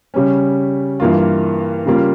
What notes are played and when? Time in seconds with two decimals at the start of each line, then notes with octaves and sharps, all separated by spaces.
0.14 C#3 G3 C#4
1.00 G2 E3 A#3 F4
1.86 C#3 G3 A#3 F4